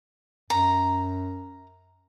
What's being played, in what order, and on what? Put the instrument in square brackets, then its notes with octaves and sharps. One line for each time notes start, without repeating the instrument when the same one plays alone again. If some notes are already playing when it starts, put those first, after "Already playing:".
[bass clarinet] F#2 [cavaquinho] A#5